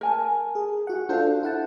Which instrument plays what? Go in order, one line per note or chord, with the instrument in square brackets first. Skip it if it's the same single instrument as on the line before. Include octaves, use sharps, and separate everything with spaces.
[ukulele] A#4 G#5 A5
[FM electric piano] G#4
F#4 F#5
[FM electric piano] D4 F4 A4 [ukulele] C5 F5
[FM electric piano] E4 F#5 A5